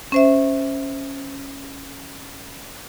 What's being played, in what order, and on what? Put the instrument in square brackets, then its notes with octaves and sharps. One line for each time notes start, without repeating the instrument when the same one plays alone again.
[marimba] C#4 C5 E5